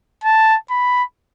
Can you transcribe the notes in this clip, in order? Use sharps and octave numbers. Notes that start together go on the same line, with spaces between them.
A5
B5